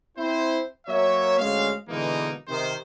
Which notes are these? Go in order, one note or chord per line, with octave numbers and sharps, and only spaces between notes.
C4 E4 C5
F#3 A#3 C#5 E5
D2 G#3 C#4 F5
B2 D3 E3 G#3 A#3 D#4
C3 D#3 C5